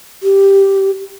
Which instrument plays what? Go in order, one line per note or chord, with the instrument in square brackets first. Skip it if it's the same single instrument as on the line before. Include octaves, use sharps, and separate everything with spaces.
[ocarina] G4